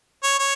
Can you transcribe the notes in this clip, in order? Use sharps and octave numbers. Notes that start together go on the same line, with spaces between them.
C#5
C#5